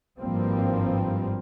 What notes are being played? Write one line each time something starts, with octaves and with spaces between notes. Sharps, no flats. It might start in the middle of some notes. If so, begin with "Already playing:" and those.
G#1 G2 F3 G3 A#3 C4